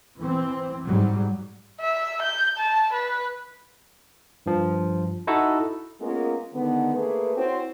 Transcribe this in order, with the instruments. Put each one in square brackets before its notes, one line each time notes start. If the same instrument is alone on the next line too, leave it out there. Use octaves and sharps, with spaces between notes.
[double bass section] E3 C4
G#2 F#3 G3
[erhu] E5
G6
A5
B4
[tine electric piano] G2 F3
D#4 E4 F#4 A4
[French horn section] G#3 A#3 B3 C#4 F4 A#4
D3 D#3 G#3 B3
A3 A#3 G#4 B4
C4 E4 F#4 C5 C#5